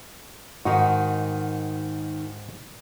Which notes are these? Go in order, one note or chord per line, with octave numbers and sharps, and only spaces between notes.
G#2 D#3 D#4 F#4 F5